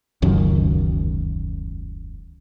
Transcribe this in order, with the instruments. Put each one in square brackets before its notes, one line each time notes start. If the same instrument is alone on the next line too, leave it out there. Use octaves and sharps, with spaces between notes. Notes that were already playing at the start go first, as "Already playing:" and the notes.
[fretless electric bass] E1 C#2 F#2 D#3